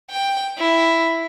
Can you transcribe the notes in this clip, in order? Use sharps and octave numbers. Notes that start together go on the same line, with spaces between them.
G5
E4